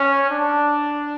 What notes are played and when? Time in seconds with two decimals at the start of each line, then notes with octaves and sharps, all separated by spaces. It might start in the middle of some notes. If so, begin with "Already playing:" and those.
Already playing: C#4
0.31 D4